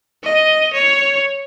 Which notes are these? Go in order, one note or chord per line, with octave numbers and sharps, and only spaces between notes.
D#5
C#5